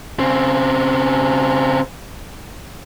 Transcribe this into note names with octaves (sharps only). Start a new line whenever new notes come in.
C#3 C4